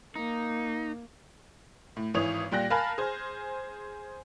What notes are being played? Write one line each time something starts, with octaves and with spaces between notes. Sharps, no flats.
A#3 D#4
A2
G#1 E3 C#5 D#6 F7
A#2 G3 G5 F#6 A#6
A#4 F5 G#5 A5 B5 F6
G#4 C5